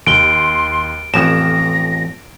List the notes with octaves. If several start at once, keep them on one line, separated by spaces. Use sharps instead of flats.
D#2 C6 D7 G7
A1 F2 A#6 E7